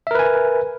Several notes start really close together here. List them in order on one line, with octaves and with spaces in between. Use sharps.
E5 A#4 B4 G#5